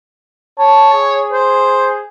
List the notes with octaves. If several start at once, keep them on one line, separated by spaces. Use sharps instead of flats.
C#5 A5
G#4
C5